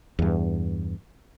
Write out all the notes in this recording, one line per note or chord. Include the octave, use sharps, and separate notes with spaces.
E2 G2